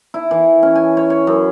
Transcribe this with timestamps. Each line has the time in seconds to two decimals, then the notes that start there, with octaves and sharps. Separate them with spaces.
0.14 E4
0.31 E3
0.63 C#4
0.75 G#5
0.97 C#5
1.10 C#5
1.27 F#2